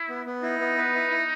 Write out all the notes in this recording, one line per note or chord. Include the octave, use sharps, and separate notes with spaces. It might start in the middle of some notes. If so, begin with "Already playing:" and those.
Already playing: E4
B3
B3
D#4 E4
B3
B4
E4
E4